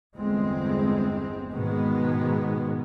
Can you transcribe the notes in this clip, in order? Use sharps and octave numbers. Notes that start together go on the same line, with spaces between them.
G1 E2 G#3 C4
G#2 B2 D#3 G#3 B3